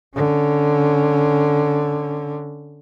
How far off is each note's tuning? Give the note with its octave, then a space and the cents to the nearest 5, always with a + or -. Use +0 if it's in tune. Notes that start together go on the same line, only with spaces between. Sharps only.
D3 +0 C#4 +0